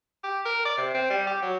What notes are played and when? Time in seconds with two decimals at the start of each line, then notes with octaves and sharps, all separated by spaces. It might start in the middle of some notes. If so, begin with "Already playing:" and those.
0.23 G4
0.45 A#4
0.65 D5
0.77 C3
0.94 C4
1.10 G3
1.27 G4
1.42 F#3